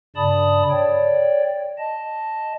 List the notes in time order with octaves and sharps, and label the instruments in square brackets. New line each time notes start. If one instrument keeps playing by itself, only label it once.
[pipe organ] G2 C#3 D5 A5 B5 D#6
C#5 D5 G5
D#5 A5